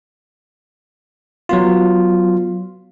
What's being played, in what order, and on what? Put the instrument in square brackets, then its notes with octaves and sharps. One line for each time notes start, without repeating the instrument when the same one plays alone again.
[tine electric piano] F#3 B3 F4